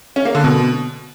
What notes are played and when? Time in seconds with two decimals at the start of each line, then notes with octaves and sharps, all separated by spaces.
0.16 C#4
0.25 A#3
0.35 D3
0.44 B2